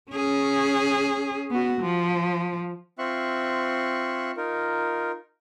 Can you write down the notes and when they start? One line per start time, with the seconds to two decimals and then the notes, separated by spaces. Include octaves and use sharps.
0.11 C#4 G#4
1.51 B3 F#4
1.81 F3
2.99 C4 F4 E5 C6 C#6 F#6
4.37 D#4 F4 A#4